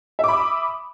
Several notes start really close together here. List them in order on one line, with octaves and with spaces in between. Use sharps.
E5 D6 B5 D#6